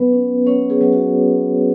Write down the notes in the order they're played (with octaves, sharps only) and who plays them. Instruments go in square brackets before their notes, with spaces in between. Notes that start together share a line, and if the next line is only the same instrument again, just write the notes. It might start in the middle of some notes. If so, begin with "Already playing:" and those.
Already playing: [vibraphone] F#3 B3 B4
C#4
F#3 C#4 C#5
G#4
F#3
F#4